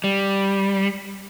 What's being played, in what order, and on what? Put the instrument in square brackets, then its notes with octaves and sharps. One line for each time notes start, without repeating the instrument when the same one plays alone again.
[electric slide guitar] G3